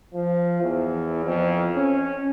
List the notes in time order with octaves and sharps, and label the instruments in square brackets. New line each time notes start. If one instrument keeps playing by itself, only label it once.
[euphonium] F3
E2
F2
C#4